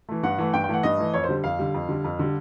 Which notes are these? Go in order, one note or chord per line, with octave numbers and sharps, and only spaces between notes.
E3 A3
G2 F#5
E3 A3
G2 G5
G5
E3 A3 F#5
G2 D#5
E3 A3
F2 C#5
C5
D3 G3
F2 F5
D3 G3
F2
D3 G3
F2
D3 G3